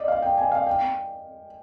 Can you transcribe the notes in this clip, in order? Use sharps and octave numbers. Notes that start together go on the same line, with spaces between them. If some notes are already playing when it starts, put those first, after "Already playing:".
Already playing: D5 D#5
F5
G5
G#5
F5
G5